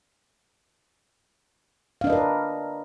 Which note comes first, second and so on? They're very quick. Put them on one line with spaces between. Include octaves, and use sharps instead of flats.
F5 D4 D#5 B4 A#4